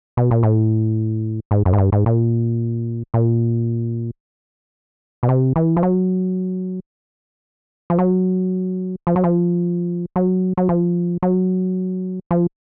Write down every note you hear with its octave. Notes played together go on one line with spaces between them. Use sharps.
B2
A#2
A2
G#2
F#2
G#2
G2
G#2
A#2
A#2
B2
C3
E3
F3
F#3
F3
F#3
F3
F#3
F3
F#3
F#3
F3
F#3
F3